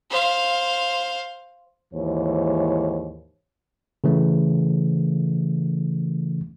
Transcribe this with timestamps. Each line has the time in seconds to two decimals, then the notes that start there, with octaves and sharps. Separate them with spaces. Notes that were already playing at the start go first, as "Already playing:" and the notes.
0.10 C5 F5
1.94 D#2 G#2 E3 C5 C#5
4.04 C#3 E3 A3